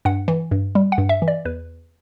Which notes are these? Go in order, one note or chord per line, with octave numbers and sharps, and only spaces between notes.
G2 F#5
E3
G2
G3
F#5
G2
E5
E3
D5
E2 B4